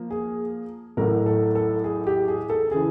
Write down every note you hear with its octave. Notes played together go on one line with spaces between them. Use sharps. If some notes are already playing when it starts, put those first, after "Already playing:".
Already playing: F3 A#3
G#4
A1 A2 F#3 A3 A#4
A4
A4
G#4
G4
G#4
A4
C#3 E3 G#4